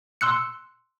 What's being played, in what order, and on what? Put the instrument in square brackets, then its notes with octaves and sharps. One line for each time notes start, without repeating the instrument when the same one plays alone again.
[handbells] C6 E6 F#6 C#7